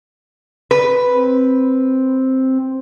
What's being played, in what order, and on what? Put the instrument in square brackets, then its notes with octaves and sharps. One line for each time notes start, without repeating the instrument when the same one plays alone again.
[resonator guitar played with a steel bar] B4
[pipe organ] C4